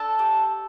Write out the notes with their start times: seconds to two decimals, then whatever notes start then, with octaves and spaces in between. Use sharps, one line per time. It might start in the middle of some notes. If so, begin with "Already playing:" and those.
Already playing: D4 A4 A5
0.19 G4